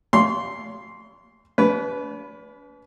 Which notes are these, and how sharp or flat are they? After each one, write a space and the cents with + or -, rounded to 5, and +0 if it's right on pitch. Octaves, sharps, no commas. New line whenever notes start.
C#5 +40 C6 +0
D4 -45 B4 +0